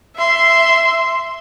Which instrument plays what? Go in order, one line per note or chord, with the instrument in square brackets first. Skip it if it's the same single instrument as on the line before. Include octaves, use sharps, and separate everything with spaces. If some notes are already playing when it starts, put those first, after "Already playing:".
[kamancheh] E5 C6